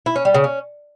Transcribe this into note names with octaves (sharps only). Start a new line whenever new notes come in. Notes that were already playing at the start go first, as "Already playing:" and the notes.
E4
C#4
G3
C#3
C#4